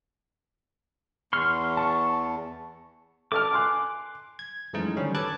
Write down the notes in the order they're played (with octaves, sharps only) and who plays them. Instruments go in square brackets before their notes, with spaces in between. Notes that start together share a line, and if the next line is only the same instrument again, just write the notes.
[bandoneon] E2 [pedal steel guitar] C6 C#6 F6
[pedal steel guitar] A5 C#6
[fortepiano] A4 A5 F6 [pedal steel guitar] D6
[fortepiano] G#5 C6 F#6
[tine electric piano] G#6
F#2 E3 F3 G#3 A3 D#4
D3 D#3 F#3 G3 C#4
A4 B4 A5 D6 F#6 G#6